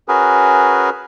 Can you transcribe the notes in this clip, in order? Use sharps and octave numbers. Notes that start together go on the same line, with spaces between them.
C#4 F#4 G#4 A#4 B4